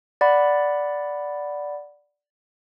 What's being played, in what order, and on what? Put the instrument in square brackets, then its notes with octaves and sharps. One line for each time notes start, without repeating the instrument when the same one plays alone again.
[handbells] D5 F#5 B5